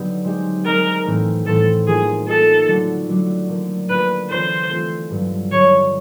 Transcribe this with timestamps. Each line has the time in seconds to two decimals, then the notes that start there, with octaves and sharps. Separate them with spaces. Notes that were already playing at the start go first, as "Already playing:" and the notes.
Already playing: D3 F#3 B3 D#4 G4
0.24 G#3 C4 D#4 G4
0.65 G#3 C4 D#4 G4 A#4
1.06 A2 E3 A3 C4
1.46 A2 E3 A3 C4 A4
1.87 F3 A#3 D#4 G#4
2.27 F3 A#3 D#4 A4
2.68 D3 F#3 A3 D4 F#4
3.08 D3 F#3 A3 D4 F#4
3.49 D3 F3 A#3
3.89 D3 F3 A#3 B4
4.30 E3 A3 C4 F4 A4 C5
4.68 E3 A3 C4 F4 A4
5.11 G2 D3 F#3
5.51 G2 D3 F#3 C#5